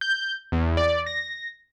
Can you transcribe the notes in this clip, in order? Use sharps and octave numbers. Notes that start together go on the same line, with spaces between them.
G6
E2
D5
A#6